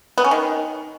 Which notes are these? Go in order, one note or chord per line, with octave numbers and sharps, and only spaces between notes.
B3
C#4
D#3